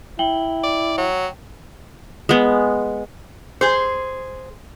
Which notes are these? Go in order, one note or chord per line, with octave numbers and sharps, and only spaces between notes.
E4 G5 F#7 G7
D5
F#3
G#3 B3
G#4 C5